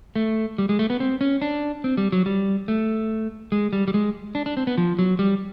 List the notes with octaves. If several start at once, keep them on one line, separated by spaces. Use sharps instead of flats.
A3
G3
G#3
A3
B3
C4
C#4
D4
C4
G3
F#3
G3
A3
G#3
G3
G3
G#3
D4
D4
C4
B3
F3
F#3
G3